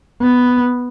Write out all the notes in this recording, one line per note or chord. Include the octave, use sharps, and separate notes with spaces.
B3